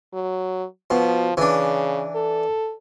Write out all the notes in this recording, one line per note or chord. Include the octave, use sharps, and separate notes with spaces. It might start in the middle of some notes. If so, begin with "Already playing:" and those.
F#3
B2 F3
C#3 E3 D4
A4